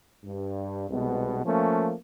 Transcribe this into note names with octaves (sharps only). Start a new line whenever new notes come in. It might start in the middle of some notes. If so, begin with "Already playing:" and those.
G2
C2 B2 G#3 B3
F3 A3 A#3 C#4